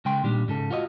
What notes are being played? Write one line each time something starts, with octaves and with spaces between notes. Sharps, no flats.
C#3 G#3 G5 C6
A#2 D#3 G3 D4
G#2 C#3 A4
F4 F#4 C#5 D#5